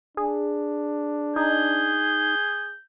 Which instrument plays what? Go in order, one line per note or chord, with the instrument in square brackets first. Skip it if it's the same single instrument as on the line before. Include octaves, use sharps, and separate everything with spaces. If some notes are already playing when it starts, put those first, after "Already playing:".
[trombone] D4 [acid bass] G#4
[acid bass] D#4 [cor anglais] G#4 [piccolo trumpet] G6